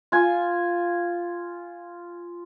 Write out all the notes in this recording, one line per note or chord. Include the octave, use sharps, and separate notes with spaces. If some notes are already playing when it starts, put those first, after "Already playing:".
F4 G#5